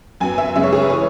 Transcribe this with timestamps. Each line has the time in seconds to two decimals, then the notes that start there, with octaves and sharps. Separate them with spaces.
0.20 F#2 F#3 B3 G#5
0.38 E5
0.55 F#2 C#3 G#3 B3 E5
0.63 C#5
0.73 G#4
0.82 B4
0.90 E3 C#5